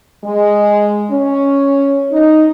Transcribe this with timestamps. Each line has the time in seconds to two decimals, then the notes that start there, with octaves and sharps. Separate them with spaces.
0.24 G#3
1.12 C#4
2.12 D#4